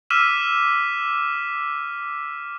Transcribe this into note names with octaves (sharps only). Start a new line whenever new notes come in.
D6 E6 F6 B6 D#7 E7